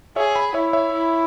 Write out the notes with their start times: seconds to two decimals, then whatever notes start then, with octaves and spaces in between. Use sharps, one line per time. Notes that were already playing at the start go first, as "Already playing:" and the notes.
0.16 G#4 C#5 E5
0.35 G#5 B5
0.54 E4 C#5 E5
0.73 C#5 E5
0.93 E4